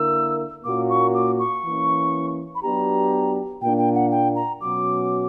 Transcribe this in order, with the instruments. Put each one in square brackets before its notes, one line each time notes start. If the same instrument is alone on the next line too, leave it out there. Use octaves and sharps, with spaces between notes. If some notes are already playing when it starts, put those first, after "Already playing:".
Already playing: [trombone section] D3 A#3 E4 A#4 [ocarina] E6
[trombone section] A#2 A#3 C#4 F#4 [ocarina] D6
[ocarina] C#6
D6
C#6
[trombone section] E3 A#3 C#4
[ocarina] B5
[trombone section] F#3 B3 D4 G4 [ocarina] A#5
[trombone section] A#2 A#3 D4 [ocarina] G5
[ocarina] G5
F#5
G5
A#5
[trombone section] B2 F#3 C#4 F#4 [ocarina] D6